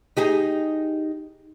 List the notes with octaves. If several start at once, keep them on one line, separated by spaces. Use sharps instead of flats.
D#4 G4 G#4